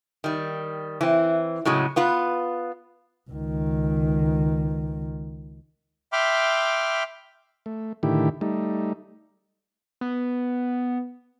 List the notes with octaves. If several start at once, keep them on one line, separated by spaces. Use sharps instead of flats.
D#3 G3
E3 C4
A2 C#3 F#3 G#3
B3 F4 B4
C#2 D#3
E5 G5 B5 C6 D6 F6
A3
A2 D3 D#3 E4 G4
G3 A3 D#4
B3